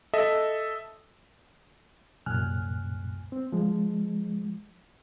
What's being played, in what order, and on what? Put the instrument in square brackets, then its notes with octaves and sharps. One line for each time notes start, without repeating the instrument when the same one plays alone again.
[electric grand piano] A4 D#5 E5
[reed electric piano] C2 F#2 A#2 G#5 F6 F#6
C4
F3 G#3